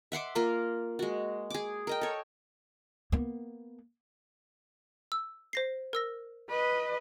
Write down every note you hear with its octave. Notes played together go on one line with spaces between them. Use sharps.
E5 F#5 C6 D6
A#3 F4 A#4 C6
G#3 F#4
G#4 D6
A#4 D#5 G5
A4 C#5
A#3 B3
E6
C5 A#6 C7
A#4 E6 A#6
B4 D#5